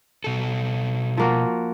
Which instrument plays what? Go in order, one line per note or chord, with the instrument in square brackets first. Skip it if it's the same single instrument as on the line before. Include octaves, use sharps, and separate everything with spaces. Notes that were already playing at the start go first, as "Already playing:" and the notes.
[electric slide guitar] B2 A4
[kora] F3 A#3 F#4